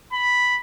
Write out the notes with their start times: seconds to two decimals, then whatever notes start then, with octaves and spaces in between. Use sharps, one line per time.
0.13 B5